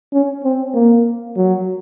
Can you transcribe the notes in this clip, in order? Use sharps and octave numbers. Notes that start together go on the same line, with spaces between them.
C#4
C4
A#3
F#3